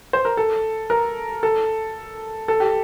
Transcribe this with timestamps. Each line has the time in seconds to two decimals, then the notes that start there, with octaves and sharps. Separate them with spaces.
0.13 C5
0.25 A#4
0.37 A4
0.90 A#4
1.43 A4
2.48 A4
2.60 G4